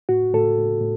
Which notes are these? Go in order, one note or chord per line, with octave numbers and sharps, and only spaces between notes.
A2 F#4
A2 A4
A2
A2